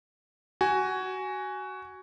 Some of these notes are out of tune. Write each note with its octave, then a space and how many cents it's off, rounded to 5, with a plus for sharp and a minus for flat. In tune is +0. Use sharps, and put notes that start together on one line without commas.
F#4 +20 G#5 +0